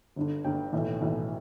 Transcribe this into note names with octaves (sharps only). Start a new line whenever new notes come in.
G1 G2 D3
G1 G2 D3 G5
B1 A2 E3
B1 A2 E3